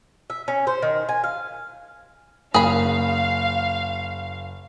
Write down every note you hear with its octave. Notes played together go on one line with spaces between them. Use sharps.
E5
C#4
C5
D#3
G#5
F5
F#1 G#4 F5 B5